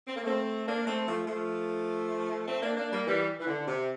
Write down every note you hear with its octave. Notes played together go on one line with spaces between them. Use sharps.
C4
A#3
A3 C4
A#3 D4
A3 C4
F3 A3
F3 A3
A3 C4
A#3 D4
A#3 D4
G3 A#3
E3 G3
E3
D3
C3